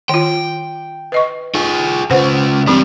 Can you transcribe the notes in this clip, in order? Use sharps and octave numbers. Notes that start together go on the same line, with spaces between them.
D#3 F4 G5
B4 D#5 C#6
D#4 F4 G#4
C#3 F4 B4 C5 F#5
E3 G3 C4 D4 D#4